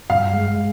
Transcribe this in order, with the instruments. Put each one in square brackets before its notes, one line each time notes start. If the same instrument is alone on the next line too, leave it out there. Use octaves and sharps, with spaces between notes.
[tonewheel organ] G2 [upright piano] F5
[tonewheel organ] G#3